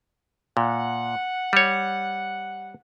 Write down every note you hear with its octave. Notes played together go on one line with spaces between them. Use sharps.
A#2 F#5
G3 C#5